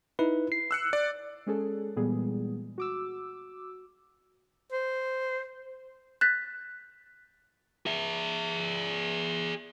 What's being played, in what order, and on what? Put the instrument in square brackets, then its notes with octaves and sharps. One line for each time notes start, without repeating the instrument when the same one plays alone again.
[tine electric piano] D#4 E4 B4
C7
[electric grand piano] E6 F#6 C#7
D5
[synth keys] G#3 C#4 G#4 A4
A#2 E3 G3 G#3 B3 G#4
F#4 D6 E6
[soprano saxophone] C5
[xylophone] F#6 G6 A6 B6
[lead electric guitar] G#4 E5